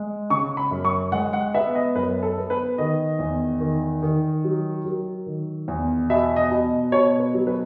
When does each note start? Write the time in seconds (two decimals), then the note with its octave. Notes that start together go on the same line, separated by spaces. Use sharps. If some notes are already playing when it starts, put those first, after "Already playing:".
Already playing: G#3
0.30 C#3 C#6
0.57 B5
0.71 F#2
0.85 C#6
1.12 G#3 F#5
1.33 F#5
1.54 B3 E5
1.75 D#5
1.95 F#2 B4
2.23 A4
2.37 B3
2.50 B4
2.78 D#3 D#5
3.19 E2
3.61 D#3
4.03 D#3
4.44 F#3
4.85 F#3
5.26 D#3
5.68 E2
6.10 B2 E5
6.36 D#5
6.51 B2
6.92 B2 C#5
7.19 B4
7.34 F#3
7.47 B4